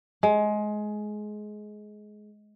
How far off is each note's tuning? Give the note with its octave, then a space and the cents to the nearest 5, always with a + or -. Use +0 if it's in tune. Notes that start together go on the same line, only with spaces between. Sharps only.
G#3 +20